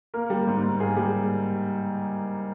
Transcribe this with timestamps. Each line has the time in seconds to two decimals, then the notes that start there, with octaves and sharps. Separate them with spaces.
0.14 A#3 A#4
0.30 G3
0.47 G#2
0.63 G#2
0.79 A#3 G#4
0.97 G3